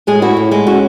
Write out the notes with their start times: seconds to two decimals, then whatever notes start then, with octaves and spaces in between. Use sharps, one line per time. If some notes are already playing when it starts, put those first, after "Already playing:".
0.07 A2 G#3 G#4
0.22 E4 F#4
0.37 A2
0.51 G#3 E4
0.67 C#4 F#4